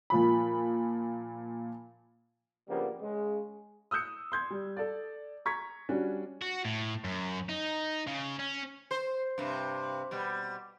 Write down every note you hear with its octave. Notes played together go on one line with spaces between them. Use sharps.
A#2 F3 B5
G2 C#3 F3 G3 A#3 B3
C#3 G#3
D#6 E6 F#6 G6 C#7
C6 G6 G#6
G3
A4 D5
A#5 C#6 G#6 B6
G3 C#4 D4 F#4
F#4
A2
F#2
D#4
C#3
C#4
C5
G2 C3
B2 G3